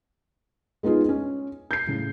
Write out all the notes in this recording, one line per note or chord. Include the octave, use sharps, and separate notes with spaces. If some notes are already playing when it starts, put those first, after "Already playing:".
G#3 B3 D#4 F4 G#4
C#4
G6 C7
A2 C#3